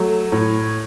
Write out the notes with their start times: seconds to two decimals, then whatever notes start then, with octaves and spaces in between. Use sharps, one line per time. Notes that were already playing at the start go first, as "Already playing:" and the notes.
Already playing: F#3 A3
0.32 A2